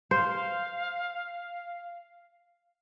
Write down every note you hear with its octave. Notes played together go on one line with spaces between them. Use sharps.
C5 F5